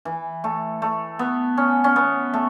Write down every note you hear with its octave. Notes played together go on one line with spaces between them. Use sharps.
E3
A3
A3
B3
C#4
C#4
B3
A3